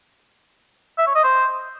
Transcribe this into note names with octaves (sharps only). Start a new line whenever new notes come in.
E5
C#5
D#5
C5